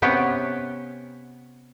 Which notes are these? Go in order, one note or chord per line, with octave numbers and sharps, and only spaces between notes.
C3 B3 C#4 B4 C#5 G5